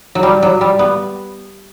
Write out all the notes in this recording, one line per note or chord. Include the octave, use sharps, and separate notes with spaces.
F#3
G3
F#3
G3
B3